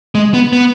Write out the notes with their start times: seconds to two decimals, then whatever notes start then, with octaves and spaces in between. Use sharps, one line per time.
0.15 G#3
0.34 B3
0.53 B3